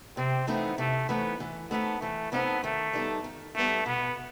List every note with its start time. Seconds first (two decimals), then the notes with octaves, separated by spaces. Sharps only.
0.17 C3 C4
0.47 E3 A3 B3 C4 D#4
0.78 C3 A3
1.09 E3 A3 B3 C4 D#4
1.40 E3
1.71 A3 B3 C4 D#4 A4
2.01 E3 A3
2.32 A3 B3 C4 D#4 A4
2.63 D#3 A3
2.93 G3 B3 D#4 A4
3.24 D#3
3.55 G3 A3 B3 D#4 A4
3.86 B2 B3